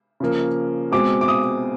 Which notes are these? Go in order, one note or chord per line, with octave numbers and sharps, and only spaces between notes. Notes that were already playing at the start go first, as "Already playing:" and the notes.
C#3 F3 A#3
B2 G#3 C4 D6
D6
D#6